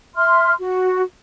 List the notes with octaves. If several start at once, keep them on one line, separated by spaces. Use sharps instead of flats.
E5 C6 F6
F#4